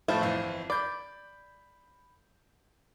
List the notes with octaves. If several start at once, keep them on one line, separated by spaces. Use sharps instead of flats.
A2 F3 A3 E4 F4 C5
G1 F2 E3
D5 B5 G6